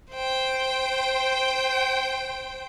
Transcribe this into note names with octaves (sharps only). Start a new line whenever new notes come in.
C5 G5